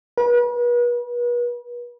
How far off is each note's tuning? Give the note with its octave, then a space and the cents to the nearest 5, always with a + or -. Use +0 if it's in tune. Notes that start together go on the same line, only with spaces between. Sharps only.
B4 -40